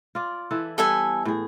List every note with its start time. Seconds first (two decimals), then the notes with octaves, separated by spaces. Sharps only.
0.15 F4 D5
0.51 E3 E4 A4
0.78 G3 B3 E4 A4 E5 G#5
1.25 A2 G#4